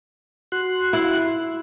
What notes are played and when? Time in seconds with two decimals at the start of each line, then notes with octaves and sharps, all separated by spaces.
0.52 F#4 C6 F#6
0.93 E4